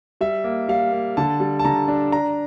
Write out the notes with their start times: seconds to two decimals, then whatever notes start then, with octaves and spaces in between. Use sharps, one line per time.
0.21 G3 E5
0.44 A#3
0.68 G3 F5
0.92 A#3
1.17 D3 A5
1.40 G3
1.59 A5
1.65 D3 A#5
1.88 D4
2.12 D4 A#5